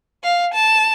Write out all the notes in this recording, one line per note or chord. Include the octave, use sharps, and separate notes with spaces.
F5
A5